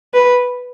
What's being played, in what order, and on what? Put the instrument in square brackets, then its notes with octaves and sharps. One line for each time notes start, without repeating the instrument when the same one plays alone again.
[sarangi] B4